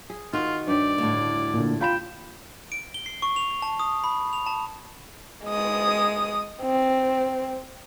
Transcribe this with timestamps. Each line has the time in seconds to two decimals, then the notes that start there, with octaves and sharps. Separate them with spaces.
0.10 G#4
0.33 D#3 F4 F#4
0.68 G2 G4 C#5 D5
0.98 D2 A2
1.54 A#2 D3
1.81 F4 G5 B5 E7
2.72 D7
2.94 G7
3.06 C7
3.22 C#6
3.36 F7
3.62 A5
3.79 D#6
4.04 B5
4.33 F7
4.46 A5
5.45 G#3 D#6
6.62 C4